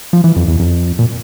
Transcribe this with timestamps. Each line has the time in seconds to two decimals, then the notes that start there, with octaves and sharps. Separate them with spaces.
0.13 F3
0.24 E3
0.36 F2
0.48 E2
0.59 F2
0.99 A#2